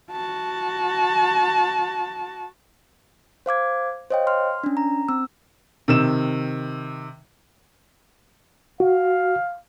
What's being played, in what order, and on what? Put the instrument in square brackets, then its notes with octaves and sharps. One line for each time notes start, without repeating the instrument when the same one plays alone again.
[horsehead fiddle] F#4 A5
[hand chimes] C5 F5 D6 G#6
C5 C#5 D#5 F5 G5
C6 F6
C#4 D4
A#5
C4 E6
[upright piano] C3 D#3 E6 E7
[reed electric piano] F#4 [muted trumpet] F5